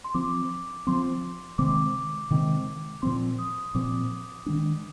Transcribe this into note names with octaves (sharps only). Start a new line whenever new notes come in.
C6
F3 C4 D6
F3 C4 C6
C3 D#3 G#3 C4 D6
C3 D#3 G#3 C4
A#2 F3 C4 C6
D#6
A#2 F3 C4 D6
D#3 G#3 D4